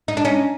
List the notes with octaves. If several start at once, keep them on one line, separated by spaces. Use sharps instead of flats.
D#4
D4
C#4 D#4